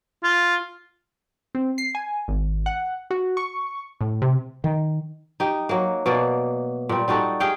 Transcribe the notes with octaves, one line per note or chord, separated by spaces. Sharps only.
F4
C4
C7
G#5
G#1
F#5
F#4
C#6
A2
C3
D#3
D#4 G4
F#3 A#3
B2 A#3 D5
A#2 G3
G3 D#4 F#4 A4
G4 G#4 F5 G5